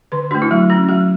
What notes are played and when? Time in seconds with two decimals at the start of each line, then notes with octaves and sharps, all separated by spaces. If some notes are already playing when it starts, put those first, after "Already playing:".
0.12 D3 B4
0.31 A3 D4 F#4
0.42 E4
0.51 F#3 F#4
0.70 C#4 F#4
0.89 F#3 F#4